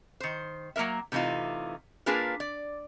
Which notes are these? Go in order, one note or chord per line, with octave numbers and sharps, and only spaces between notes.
D#3 C5
F#3 A#3 A4 A#4 E5
C3 E3 A3 D#4 F4
A#3 D4 F4 G#4 A#4 B4
D5